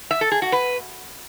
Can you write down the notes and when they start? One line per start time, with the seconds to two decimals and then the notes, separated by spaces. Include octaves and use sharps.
0.11 E5
0.21 A4
0.31 G#4
0.42 F#4
0.52 B4